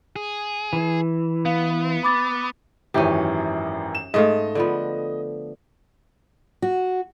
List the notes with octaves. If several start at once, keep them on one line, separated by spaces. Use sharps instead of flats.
G#4
E3
B3 F5
B5 D6 A6
G#1 F#2 E3 C#4 G4
E7
G#2 A3 D#5 F5
D3 F3 B3
F#4